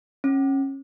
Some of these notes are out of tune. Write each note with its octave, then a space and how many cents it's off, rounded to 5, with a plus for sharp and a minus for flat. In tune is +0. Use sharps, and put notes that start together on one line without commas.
C#4 -25